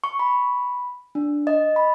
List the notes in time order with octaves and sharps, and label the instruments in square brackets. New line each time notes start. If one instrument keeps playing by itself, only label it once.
[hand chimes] C#6
B5
D4
D#5
B5